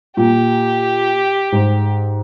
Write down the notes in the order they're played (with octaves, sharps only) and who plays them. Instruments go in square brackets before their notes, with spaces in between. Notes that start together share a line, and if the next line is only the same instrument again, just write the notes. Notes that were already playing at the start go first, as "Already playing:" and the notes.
[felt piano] A#2 [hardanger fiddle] G4
[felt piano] G#2 C5